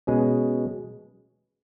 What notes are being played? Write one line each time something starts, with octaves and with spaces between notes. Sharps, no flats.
B2 G#3 C#4 G#4